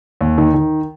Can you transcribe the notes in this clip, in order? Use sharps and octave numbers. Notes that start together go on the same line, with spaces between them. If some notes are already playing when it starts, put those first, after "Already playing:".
D#2
D#3
D#3